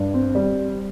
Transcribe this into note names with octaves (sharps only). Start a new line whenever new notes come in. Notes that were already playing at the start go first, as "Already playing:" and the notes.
Already playing: G2
C4
G3